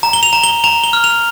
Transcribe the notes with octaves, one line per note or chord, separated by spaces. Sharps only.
A#5
G7
F7
A#5
G7
A#5 F7
G7
F6
F7